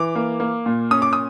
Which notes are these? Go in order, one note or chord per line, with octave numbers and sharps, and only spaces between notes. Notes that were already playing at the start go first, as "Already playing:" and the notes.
Already playing: E3 D6
A#3
A#3
A#2
C#4 D#6
D6
D#6